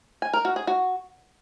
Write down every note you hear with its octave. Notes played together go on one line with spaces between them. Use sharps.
G#5
A#4
F#4
G#4
F#4